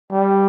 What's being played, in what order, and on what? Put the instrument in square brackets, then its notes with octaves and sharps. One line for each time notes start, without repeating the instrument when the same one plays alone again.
[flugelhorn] G3